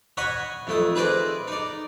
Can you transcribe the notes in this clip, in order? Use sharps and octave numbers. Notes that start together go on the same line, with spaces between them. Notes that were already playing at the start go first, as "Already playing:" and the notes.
C#5 D#5 F#5 G#5 B5 C#6
F2 A3 D#6
G#4 B4 C5 D5 D#5
D#4 D5